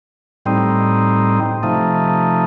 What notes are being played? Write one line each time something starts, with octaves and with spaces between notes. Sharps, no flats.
A2 G3 C4 D#4
C3 F3 A3 D#4